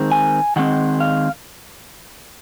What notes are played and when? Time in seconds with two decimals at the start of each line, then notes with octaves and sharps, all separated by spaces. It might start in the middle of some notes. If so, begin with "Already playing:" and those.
Already playing: D#3 G#3 C4
0.12 G#5
0.56 D#3 G#3 C4 F#5
1.00 F5